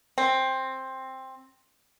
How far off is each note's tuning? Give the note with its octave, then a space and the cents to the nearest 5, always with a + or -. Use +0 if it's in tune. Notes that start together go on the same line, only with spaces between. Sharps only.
C4 +10